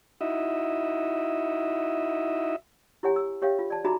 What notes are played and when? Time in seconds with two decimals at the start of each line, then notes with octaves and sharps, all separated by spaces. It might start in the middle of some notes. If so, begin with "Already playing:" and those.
0.21 D#4 E4 F#4 D#5 E5
3.03 E4 G4 C#5 F#5 G#5
3.16 E6
3.42 G4 C#5 E5 F5 G5
3.59 F4
3.70 D5 A5
3.84 D#4 F#4 G#4 E5 A#5 B5